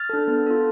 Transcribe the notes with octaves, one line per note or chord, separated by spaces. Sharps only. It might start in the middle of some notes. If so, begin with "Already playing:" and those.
Already playing: F6 A6
D4 A4
B3
F4 A4